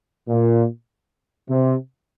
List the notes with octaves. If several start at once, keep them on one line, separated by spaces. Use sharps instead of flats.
A#2
C3